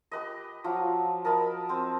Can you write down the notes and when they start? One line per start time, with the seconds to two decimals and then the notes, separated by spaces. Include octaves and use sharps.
0.11 G4 B4 D#5
0.64 F3 F#3 F5
1.25 A#4 D#5 A5 B5
1.69 C4 C5